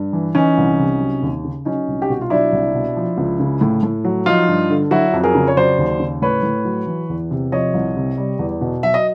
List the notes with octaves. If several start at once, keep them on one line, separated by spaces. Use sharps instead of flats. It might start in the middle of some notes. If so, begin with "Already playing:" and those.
Already playing: G2
E3
E3 C#4 D#4
C2
C3
F#3
D#2
C#3
F#3 C#4 D#4
C2
G4
B2 F#4
F4
F#3 D4 E4
C2
B2
F3
C#2
C#3
A2
A2
F#3
F3 D#4 F4
G2
D3
F#3 E4 F#4
F2
G#4 A#4
C#3
C#5
F#3 C5 D5
D#2
C#3
A2 B4 C#5
A2
F#3
E3
E2
C3
F3 C#5 D#5
C2
C3
G3
E2
B2
F#3 E5
D#5